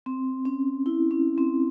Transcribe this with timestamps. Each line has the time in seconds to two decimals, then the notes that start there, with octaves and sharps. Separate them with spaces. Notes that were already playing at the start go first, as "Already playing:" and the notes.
0.06 C4
0.45 C#4
0.86 E4
1.11 C#4
1.38 C4